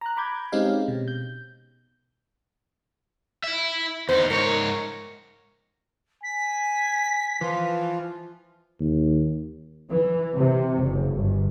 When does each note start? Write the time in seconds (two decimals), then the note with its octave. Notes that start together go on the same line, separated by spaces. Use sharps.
0.01 A#5 F#6
0.16 A#5 B5 D6 G6 G#6
0.52 G#3 C4 C#4 D#4 G4 F5
0.88 B2
1.08 G6
3.44 E4 E5
4.09 E2 D#4 C5
4.30 G#2 A#4 C#5
6.23 G#5 B6
7.41 E3 F3 F4
8.80 D#2
9.91 E3
10.36 C3
10.83 F#1
11.15 G1